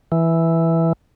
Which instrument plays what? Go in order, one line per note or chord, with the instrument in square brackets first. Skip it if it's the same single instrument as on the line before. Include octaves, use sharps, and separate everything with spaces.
[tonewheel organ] E3